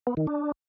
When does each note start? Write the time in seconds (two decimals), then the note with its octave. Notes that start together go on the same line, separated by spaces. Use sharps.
0.07 B3
0.17 D#3
0.27 D4